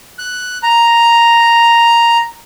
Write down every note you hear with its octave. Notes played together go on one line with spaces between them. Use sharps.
F#6
A#5